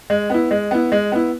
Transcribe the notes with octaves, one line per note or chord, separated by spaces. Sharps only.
G#3
B3 E4
G#3
B3 E4
G#3
B3 E4